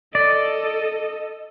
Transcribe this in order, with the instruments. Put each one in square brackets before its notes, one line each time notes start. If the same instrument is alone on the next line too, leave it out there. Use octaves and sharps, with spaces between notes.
[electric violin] A4 D#5 [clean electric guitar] D5